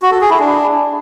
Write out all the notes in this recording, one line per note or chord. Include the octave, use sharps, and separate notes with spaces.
F#4
A4
G#4
E4
D4